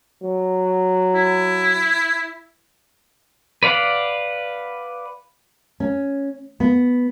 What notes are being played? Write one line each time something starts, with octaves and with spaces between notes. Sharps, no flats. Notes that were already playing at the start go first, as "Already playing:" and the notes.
F#3
E4
B4 D5 F5 F#5
C#4
B3